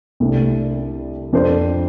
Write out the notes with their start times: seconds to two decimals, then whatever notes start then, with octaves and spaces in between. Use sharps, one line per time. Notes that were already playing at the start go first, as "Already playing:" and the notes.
0.20 C2 C3 A3 D4
1.33 F2 F3 D4 A4 C5